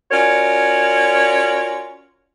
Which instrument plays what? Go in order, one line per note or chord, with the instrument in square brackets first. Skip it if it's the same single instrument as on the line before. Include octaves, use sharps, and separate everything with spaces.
[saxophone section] C#4 F4 F#4 A#4 C#5 D5